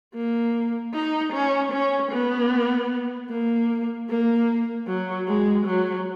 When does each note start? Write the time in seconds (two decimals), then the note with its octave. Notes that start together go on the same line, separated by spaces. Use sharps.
0.14 A#3
0.94 D#4
1.33 C#4
1.72 C#4
2.12 B3
3.30 A#3
4.10 A#3
4.88 F#3
5.28 G#3
5.66 F#3